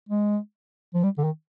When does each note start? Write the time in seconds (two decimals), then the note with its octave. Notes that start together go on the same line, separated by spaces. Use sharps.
0.09 G#3
0.94 F3
1.03 G3
1.18 D3
1.24 D#3